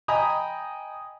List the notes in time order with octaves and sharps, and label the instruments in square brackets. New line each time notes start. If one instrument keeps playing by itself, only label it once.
[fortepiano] D#5 G5 G#5 A#5 B5 D#6